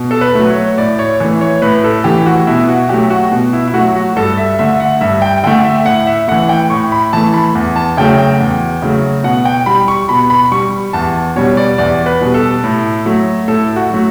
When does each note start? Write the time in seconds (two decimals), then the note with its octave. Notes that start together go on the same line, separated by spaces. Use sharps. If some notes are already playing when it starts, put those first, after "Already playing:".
Already playing: B2
0.11 A4
0.21 B4
0.35 F#3 A3
0.50 C#5
0.78 A2 D5
0.99 C#5
1.20 E3 A3
1.41 C#5
1.62 A2 B4
1.84 A4
2.04 E3 A3 G4
2.26 F#4
2.47 B2 E4
2.68 F#4
2.89 F#3 A3 G4
3.10 F#4
3.32 B2
3.53 E4
3.68 E4
3.74 F#3 A3 F#4
3.96 F#4
4.16 G2 A4
4.37 E5
4.59 D3 A3 E5
4.80 F#5
5.01 G2 E5
5.22 G5
5.43 D3 A3 G5
5.64 E5
5.86 A2 F#5
6.07 E5
6.28 E3 A3 F#5
6.49 G5
6.70 A2 C#6
6.92 B5
7.13 E3 A3 A5
7.34 B5
7.55 E2
7.76 A5
7.97 C#3 F#3 A3 G5
8.18 G5
8.40 E2
8.82 C#3 F#3 A3
9.24 B2 F#5
9.45 G5
9.66 G3 B5
9.88 C#6
10.09 B2 B5
10.30 B5
10.52 G3 C#6
10.93 E2 A5
11.36 B2 G3 C#5
11.57 D5
11.78 E2 D5
12.06 B4
12.21 B2 G3
12.34 A4
12.64 A2
13.06 F#3 A3
13.48 A2 A4
13.76 F#4
13.90 F#3 A3